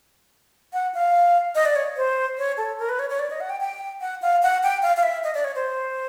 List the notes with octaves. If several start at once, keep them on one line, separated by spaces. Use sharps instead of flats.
F#5
F5
D#5
D5
C#5
C5
C#5
A4
A#4
B4
C#5
C#5
D5
D#5
F#5
G5
G5
F#5
F5
F#5
G5
F5
F5
E5
D#5
D5
C#5
C5